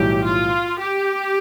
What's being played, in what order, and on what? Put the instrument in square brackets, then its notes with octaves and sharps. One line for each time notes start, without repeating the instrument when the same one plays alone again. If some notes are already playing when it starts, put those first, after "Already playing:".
Already playing: [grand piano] B1 A2 E3 G3 [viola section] G4
[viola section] F4
G4